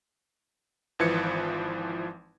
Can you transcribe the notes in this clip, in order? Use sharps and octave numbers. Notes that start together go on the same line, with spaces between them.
G#1 E3 F3 B4 G#6 C#7